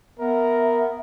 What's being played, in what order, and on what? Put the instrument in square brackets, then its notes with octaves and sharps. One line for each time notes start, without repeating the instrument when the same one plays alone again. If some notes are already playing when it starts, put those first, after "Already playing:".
[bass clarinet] B3 [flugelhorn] A#4 [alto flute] E5